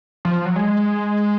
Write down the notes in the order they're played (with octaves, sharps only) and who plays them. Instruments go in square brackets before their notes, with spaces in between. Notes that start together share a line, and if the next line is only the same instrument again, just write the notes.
[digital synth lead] F3
F#3
G#3